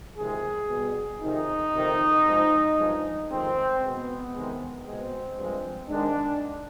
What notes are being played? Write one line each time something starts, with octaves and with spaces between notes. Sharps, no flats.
F2 C3 D#3 G#3 G#4
B2 G3
F2 C3 D#3 D#4
F2 C3 D#3
G#2 F3 G#3
G2 F3 G#3
F2 D#3 G#3 C4
B2 G#3 B3
C3 D#3 G#3
B2 G#3 C4
G2 F3 G#3
G#2 D#3 G#3 D4